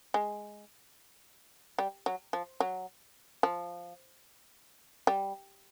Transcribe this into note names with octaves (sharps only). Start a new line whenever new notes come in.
G#3
G3
F#3
F3
F#3
F3
G3